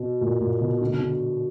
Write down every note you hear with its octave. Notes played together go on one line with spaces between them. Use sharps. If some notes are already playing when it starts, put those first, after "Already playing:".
Already playing: B2
A#2
A#2
B2
D3
B2
D3